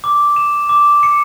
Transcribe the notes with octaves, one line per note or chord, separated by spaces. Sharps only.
D6
E7
D6
C#7